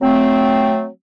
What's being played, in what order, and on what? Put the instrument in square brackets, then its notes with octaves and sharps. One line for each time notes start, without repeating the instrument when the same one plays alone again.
[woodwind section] F#3 A3 C4